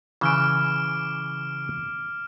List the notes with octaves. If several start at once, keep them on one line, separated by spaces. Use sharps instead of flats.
C#3 E3 D6 F6 D7